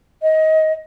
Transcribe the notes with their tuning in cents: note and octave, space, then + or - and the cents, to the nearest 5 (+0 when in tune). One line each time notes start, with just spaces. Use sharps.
D#5 +20